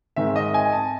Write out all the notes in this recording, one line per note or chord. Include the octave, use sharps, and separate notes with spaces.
G#2 D#3 G#3 C4 E5
D#5
G#5
A5